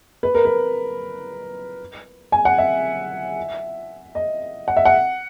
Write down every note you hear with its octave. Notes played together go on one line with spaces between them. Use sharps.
B4
A#4
B4
G#5
F#5
E5
D#5
F#5
E5
F#5